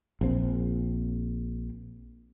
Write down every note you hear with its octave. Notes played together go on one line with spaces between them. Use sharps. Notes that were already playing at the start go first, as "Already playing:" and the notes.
A#1 C4